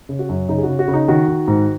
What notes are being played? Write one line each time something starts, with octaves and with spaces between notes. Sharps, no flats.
C#3
F#4
F#2
C#3 D#4
G#4
F#4
C#3
F#4
C#3
D#4
D#3 F#4
D#3
G#2